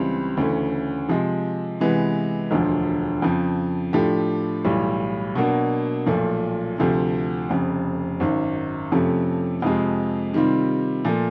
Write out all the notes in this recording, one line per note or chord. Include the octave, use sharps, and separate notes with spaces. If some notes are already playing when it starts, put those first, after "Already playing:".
Already playing: C#2 C#3 E3 G3 C4
D2 C#3 E3 A3 C#4
C3 F3 G#3
C3 E3 G#3 B3
E1 D2 D3 F3
F2 C#3 F3
A2 F3 A3 D4 G4
B1 A2 E3 G3
B2 F#3 A#3 D4
B1 A#2 F3 A3
D2 C3 F3 A3
F1 F2 C#3
G#1 F#2 D#3
F2 C3 F3 A3 C#4
F2 C3 F3 G#3
C3 D#3 G3 C4 F4
A#2 F3 A3